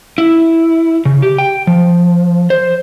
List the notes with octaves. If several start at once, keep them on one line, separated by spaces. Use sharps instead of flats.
E4
C#3
G4
G5
F3
C5